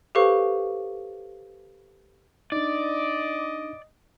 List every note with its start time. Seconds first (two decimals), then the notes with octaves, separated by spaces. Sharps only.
0.15 G4 A4 B4 C5 F5 C#6
2.52 D4 D#4 D5 D#5 D6